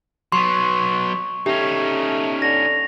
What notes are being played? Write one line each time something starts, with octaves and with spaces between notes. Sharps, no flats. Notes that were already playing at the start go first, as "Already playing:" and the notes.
F#3 B3 C6 C#6
A3 C#4 D#4 G4
D3 A#6 F7